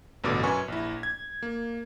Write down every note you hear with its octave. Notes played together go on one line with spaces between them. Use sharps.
A1 G2 B2 D3 D6
F#2 B4 G#5 C#6
A#1 E4
G#6
A#3